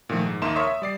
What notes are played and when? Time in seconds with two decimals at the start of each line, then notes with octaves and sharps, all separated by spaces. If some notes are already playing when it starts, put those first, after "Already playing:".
0.09 A#2 D#3 F3 A3
0.26 G#2
0.41 D#2 A#3 D#4 E5 C6 E7
0.56 A#4 C#5 E5 C6 C#6 D#6
0.67 E5
0.82 G3 D5 C7